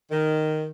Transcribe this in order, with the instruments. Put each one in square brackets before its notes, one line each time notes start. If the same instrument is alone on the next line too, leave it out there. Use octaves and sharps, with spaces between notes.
[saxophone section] D#3